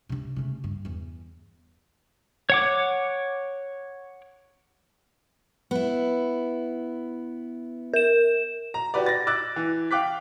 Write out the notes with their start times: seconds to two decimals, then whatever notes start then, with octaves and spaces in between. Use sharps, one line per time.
0.09 C3 D4
0.36 C#3 A3
0.64 G2
0.85 E2 E3
2.50 C#5 F#5 D6
5.71 B3 E4
7.93 A#4 E7
8.74 A#5
8.94 F#4 G4 B4 D5
9.06 A6 A#6
9.27 D6 E6 F#6 A6
9.56 E3
9.91 F5 G5 D6 F#6 B6